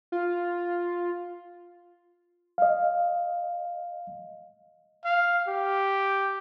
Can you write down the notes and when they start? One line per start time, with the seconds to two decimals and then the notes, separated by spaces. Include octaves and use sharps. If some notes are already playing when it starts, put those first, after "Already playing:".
0.12 F4
2.58 D#5 F5
5.05 F5
5.48 G4